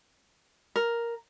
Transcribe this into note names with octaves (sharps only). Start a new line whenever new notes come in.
A#4